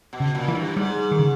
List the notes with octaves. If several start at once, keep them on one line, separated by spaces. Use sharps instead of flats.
B2
C#3
A#2
E3
G2
G#2 G3
D#3
C#3